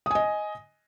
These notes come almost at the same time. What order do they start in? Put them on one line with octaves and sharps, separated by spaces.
D#6 G#5 D#5